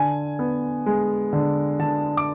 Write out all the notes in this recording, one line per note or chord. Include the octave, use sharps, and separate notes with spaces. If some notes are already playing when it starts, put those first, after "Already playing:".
Already playing: D3 G#5
B3
G#3
D3
D3 A5
D6